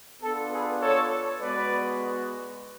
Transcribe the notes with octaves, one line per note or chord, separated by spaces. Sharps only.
B3 D4 F4 A4
G#4 B4
A4 C#5
G#3 B3 F#4 B4 D5